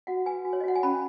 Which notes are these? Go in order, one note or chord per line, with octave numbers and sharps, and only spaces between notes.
F#4 F#5
B4 G#5
F#4
C#5
D#5
F#4 F#5
G#5
C#4 B5